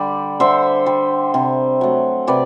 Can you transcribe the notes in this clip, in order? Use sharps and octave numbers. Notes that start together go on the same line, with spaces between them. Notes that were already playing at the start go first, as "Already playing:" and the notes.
Already playing: D3 G3 D5
D3 C5 E5
G3
C3
F#3 A3
C3 B4 D5